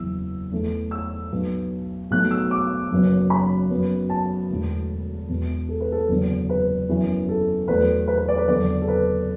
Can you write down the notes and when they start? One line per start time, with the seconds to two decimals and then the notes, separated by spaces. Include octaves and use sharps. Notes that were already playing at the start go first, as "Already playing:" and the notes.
Already playing: F#1 E2 E3 E6
0.51 E2 E3 A3
0.91 E6
1.32 B1 B2 B3
2.11 B1 B2 A3 F#6
2.31 E6
2.51 D6
2.91 F#1 F#2 F#3 B3
3.30 B5
3.70 F#2 F#3 B3
4.10 A5
4.50 E1 E2 D3 A3
5.29 E1 E2 B2 B3
5.69 A4
5.81 B4
5.92 A4
6.09 F#1 E2 D3 B3
6.50 B4
6.89 F#2 E3 B3
7.29 A4
7.68 E2 B2 F#3 A3 B4
8.08 B4
8.18 B4
8.28 D5
8.38 B4
8.48 F#1 E2 D3 D5
8.82 A4
8.88 B4